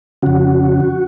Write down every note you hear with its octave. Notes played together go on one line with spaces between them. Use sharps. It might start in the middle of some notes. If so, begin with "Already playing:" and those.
F2 C#3 F#4